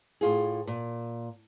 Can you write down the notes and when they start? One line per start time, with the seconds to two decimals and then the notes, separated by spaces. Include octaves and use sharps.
0.21 A2 F4 G#4
0.67 A#2